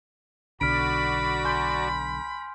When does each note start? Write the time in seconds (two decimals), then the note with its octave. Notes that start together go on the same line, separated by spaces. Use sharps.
0.61 B1 D3 F#4 D5 B5 F6 B6 D7
1.45 G#5 C6 G6